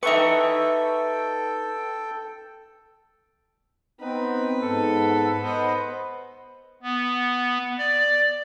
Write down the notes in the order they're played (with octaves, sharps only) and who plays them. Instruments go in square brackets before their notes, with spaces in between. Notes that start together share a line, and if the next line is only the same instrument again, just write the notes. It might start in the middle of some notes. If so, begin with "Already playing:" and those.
[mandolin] D#4 G4 C#6 [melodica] A4 G5 [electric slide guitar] B4 E5
[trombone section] B3 [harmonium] C4 [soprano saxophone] D#4 [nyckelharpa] B4
[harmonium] G#2 [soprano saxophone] A4
[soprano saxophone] B3 [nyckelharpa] C5 D#5
[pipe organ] B3
D5